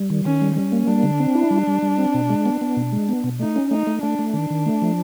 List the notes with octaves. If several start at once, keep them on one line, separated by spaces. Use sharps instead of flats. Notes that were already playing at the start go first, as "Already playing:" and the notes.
Already playing: G3
D#3
D#3 C#4
G3
G3 C#4
A#3
G3 D4
D3
C4
E4
G3
G3
G3
C4
B2
G#3
B3
B3
B2
G#3
B3
B2
A3 D#4
C#4
A3 D#4
A3
A3 D4
A3
D#3 D4
D#3
A3
F3